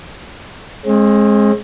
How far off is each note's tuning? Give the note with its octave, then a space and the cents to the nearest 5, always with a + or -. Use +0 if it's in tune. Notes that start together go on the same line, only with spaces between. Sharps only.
G#3 +10 C4 +45